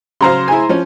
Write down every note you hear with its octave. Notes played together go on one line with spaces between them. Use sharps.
C#3 F#3 C5 F5 A#5 C6
E4 G#4 G#5
F3 C#4